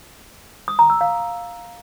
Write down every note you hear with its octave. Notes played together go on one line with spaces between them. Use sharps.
D#6
A#5
E6
F5